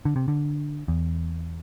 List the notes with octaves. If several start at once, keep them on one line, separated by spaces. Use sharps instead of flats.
D3
C3
D3
E2